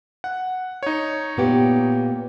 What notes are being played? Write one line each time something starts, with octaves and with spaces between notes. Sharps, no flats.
F#5
D#4 C#5
A#2 B3 G4